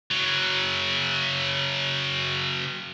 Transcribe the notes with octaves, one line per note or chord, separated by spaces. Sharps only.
C#3 F#3